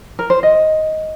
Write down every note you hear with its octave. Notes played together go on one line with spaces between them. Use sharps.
A#4
C5
D#5